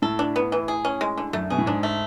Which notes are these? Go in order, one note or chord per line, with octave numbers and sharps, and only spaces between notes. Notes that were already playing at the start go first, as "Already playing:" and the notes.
A2 A4
D4
B3
E3
G#4
C#4
G#3
D3
F#2 A3
B2 G#4
A2
G#2 D4
A3